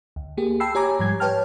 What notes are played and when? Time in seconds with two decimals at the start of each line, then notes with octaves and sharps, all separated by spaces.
0.16 D2
0.37 A#3 G4 G#4
0.60 G5 A5 B5 E6 C7
0.75 G4 C#5 G#5 A#5 D6
0.99 G#2 F3 G3 G#6
1.20 B4 C#5 G5 A5 F6